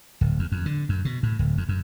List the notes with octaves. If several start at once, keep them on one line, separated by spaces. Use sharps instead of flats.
D1
E2
F2
D3
F#2
B2
A2
D1
F2
F#2